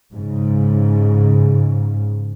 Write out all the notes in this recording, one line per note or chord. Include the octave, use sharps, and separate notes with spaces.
G#2 C#3